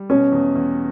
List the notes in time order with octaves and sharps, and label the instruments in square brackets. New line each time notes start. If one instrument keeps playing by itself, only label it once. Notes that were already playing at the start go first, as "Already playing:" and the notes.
Already playing: [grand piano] G3
[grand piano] B2 [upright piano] C#4
[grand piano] E2
E2